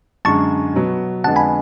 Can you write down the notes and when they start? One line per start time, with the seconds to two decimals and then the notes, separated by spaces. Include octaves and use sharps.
0.25 F#2 D3 G#3 D4 A5 C#6
0.74 B2 F#3 B3
1.24 F2 D3 G#3 B3 F#5 A5
1.36 G#5 B5